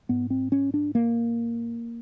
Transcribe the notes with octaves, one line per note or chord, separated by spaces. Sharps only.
G#2 B3
C4
C#4
D4
A#3